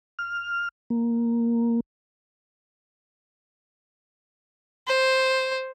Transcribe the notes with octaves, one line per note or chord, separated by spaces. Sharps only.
F6
A#3
C5